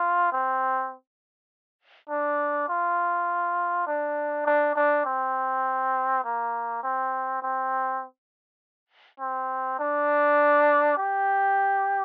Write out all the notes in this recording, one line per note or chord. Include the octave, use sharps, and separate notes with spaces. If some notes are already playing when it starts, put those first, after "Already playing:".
Already playing: F4
C4
D4
F4
D4
D4
D4
C4
A#3
C4
C4
C4
D4
G4